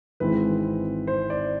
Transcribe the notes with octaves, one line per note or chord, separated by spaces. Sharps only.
G#1 G#2 E3 G#3 C4 B4
C5
D5